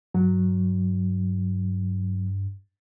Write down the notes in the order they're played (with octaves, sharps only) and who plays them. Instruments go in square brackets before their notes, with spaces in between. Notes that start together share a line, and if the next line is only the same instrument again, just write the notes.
[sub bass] G2 [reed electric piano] F#3